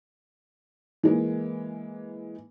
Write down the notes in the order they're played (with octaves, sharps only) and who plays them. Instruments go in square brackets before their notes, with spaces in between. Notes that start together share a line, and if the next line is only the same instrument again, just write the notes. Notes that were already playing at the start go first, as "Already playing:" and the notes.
[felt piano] E3 G#3 A#3